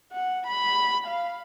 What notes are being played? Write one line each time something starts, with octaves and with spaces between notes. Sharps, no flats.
F#5
B5
F5